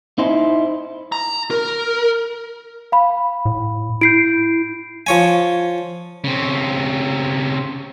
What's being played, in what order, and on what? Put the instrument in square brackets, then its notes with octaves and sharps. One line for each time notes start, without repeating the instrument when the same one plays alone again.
[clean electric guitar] D#4 E4 C5
[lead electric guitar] A#5
A#4
[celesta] F5 B5
[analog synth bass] A2
[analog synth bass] E4 [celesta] G6 C7 D7
[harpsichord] F3 C#5 G#5
[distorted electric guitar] C#3 C4